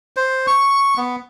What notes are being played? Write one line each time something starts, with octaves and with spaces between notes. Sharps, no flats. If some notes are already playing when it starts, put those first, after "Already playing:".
C5
C#6
B3